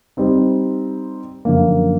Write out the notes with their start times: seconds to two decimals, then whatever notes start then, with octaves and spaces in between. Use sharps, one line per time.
0.17 G3 C4 D#4
1.45 F#2 D3 F3 A#3